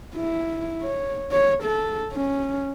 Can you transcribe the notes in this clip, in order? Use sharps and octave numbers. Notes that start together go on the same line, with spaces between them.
E4
C#5
C#5
A4
C#4